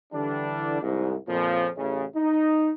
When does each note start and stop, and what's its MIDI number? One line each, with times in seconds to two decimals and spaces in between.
0.13 0.78 50
0.13 0.78 52
0.13 0.78 55
0.13 0.78 62
0.82 1.15 36
0.82 1.15 44
1.28 1.68 41
1.28 1.68 46
1.28 1.68 49
1.28 1.68 53
1.77 2.05 33
1.77 2.05 49
2.16 2.71 63